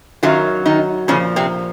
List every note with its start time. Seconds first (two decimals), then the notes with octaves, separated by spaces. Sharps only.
0.23 F#2 D#3 F#3 F4
0.66 D#3 D#4
1.08 A#2 C#3 F3 C#4
1.36 C3 C4